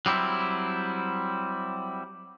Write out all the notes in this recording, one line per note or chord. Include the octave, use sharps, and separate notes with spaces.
F#3 G3 C4 E4